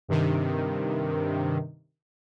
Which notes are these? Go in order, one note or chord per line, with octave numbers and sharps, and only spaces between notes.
G2 C3 D#3